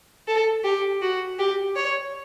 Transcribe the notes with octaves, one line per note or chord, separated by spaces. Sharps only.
A4
G4
F#4
G4
C#5